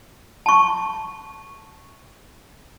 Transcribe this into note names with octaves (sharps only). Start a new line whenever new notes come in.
A5 C#6